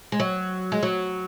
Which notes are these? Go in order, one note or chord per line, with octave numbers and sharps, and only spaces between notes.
G#3
F#3
G#3
F#3